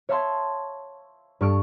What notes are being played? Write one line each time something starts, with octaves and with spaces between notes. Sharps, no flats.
C#5 E5 F5 A5 C6 G#6
G2 A4 C#6 F6 D7